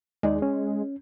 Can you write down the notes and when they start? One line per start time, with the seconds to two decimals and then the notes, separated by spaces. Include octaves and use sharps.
0.23 D#2 G#3 D#4 D5
0.42 C#4